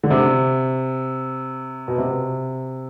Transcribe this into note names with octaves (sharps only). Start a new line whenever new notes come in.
D3
C3
B2
C3